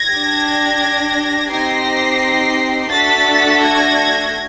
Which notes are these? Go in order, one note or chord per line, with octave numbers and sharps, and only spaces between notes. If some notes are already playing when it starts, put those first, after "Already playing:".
Already playing: G#6 A#6
D4 G4
C4 D#4 G4 A#6 C7
A3 D4 F#4 A4 A6 B6
G#6 A#6